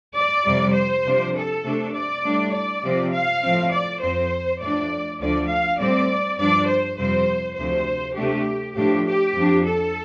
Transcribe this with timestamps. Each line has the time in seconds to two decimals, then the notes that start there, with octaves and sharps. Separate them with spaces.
0.17 D5
0.45 F2 C3 G3
0.75 C5
1.06 C3 F3 D4
1.35 A4
1.64 C3 A3 D4
1.94 D5
2.24 A2 G3 D4
2.54 D5
2.83 C3 F3 C4
3.13 F5
3.43 A2 F3 C4
3.71 D5
4.01 F2 F3 C4 C5
4.61 A2 F3 D4 D5
5.20 D2 D3 F3 D5
5.49 F5
5.79 A2 G3 C4 D5
6.38 G2 F3 D4 D5
6.68 C5
6.98 F2 C3 G3 C4 C5
7.57 D2 C3 F3 C5
8.16 C3 A3 D4 G4
8.76 A2 F3 D4 G4
9.06 G4
9.35 F2 F3 D4
9.65 A4